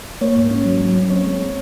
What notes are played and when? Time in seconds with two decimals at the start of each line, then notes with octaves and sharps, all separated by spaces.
0.21 A#3 C#5
0.37 G#2
0.51 C#4
0.66 F#3
0.81 F#3
0.95 C#4
1.10 C4 C#5
1.25 G#3
1.40 C4